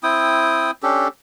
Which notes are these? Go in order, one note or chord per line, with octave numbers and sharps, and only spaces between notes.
C4 E4 G5 D#6
C#4 D4 G4 A4